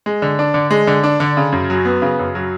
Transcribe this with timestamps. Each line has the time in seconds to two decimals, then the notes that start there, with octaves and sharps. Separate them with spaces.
0.06 G#3
0.22 D3
0.39 D4
0.54 D3
0.71 G#3
0.87 D3
1.03 D4
1.20 D3
1.37 C#3
1.52 F#2
1.70 F#3
1.85 B3
2.02 C#3
2.19 F#2
2.35 F#3